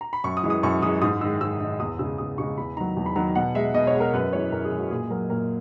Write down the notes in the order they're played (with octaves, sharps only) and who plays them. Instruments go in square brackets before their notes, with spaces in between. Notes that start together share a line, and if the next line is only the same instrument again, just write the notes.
[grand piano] A#5
B5
F#2 C#6
D#6
E3 G#3
D#6
F#2 C#6
E3 G#3 D#6
G#2 D#6
D#3 G#3 E6
G#2 E6
D#3 G#3
E2 D#6
C#3 G#3 E6
E2 D#6
C#3 G#3 C#6
E2 B5
D#3 F#3 A#5
E2
B5
D#3 F#3 A#5
B2 F#5
G#3 E5
B2 D#5
C#5
G#3
A#4
F#2 B4
E3 G#3 C#5
F#2 A#4
G#4
E3 G#3
F#4
A#2 G#4
F#3 A#4
A#2 A#4